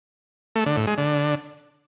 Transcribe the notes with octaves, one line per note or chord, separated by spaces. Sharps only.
A3
D3
A2
G#3
D3